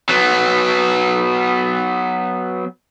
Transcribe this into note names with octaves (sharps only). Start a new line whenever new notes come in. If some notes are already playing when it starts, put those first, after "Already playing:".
F#3 B3